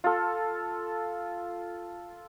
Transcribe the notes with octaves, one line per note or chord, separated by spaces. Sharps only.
F4 A4